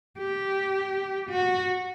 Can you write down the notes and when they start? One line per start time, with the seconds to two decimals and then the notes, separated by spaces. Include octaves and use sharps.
0.18 G4
1.30 F#4